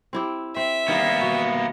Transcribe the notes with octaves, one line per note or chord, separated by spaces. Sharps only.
C4 E4 G4
C4 E5
D#3 G3 A#3 B3
B2